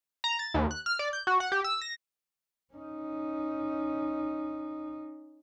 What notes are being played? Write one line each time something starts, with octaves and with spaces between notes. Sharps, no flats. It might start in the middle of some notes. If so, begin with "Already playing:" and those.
A#5
A6
D#2
F#6
F6
D5
G6
F#4
F#5
G4
E6
A#6
C#4 D#4